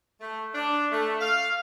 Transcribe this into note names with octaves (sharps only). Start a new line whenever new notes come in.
A3
D4
A3
F5